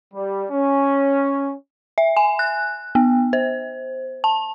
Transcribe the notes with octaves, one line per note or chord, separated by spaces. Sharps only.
G3
C#4
E5
G#5
F#6
B3
C5
A5